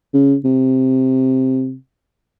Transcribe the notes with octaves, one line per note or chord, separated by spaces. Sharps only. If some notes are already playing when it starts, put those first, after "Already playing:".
C#3
C3